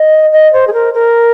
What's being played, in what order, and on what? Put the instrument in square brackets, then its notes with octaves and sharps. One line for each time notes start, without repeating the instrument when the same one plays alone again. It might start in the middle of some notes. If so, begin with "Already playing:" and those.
Already playing: [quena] D#5
D#5
C5
G#4
A#4
A#4